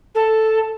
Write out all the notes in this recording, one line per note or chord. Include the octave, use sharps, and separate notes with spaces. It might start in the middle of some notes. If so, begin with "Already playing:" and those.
A4